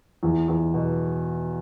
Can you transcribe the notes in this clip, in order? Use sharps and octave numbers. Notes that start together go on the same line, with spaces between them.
E2
E2
B2